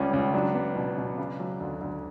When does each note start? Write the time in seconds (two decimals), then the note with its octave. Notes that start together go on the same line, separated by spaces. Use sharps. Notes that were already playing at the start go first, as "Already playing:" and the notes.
Already playing: C#2 C#3 G3 C#4
0.13 C#2
0.34 F#3 D4
0.54 B3
0.76 B2
0.98 B2
1.18 C#3
1.40 F#3
1.60 D2
1.81 D2